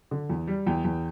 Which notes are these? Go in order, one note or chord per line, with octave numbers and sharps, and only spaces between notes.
D3
E2
G3
E2 G5
E2